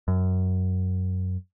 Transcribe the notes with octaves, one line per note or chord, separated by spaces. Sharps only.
F#2